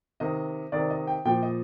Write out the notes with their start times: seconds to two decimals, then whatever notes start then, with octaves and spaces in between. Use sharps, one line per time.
0.20 C3 D#3 D#5
0.72 C3 D#3 D5
0.90 D#5
1.07 G5
1.25 A#2 F3 G5
1.43 D#5